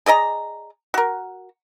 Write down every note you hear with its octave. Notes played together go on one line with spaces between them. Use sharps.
G#4 D5 D#5 A#5
F#4 A#4